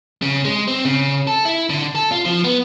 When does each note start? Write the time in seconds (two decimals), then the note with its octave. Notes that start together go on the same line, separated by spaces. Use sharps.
0.22 C#3
0.45 G#3
0.68 C4
0.85 C#3
1.27 A4
1.45 E4
1.70 D3
1.95 A4
2.12 F4
2.25 F3
2.44 B3